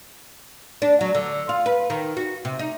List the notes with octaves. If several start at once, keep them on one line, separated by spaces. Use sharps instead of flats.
D4
F#3
D3
F4
B4
D#3
F#4
C3
D#4